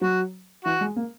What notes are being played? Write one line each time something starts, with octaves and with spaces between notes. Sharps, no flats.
F#3 F#4
E3 F#4
G#3
A#3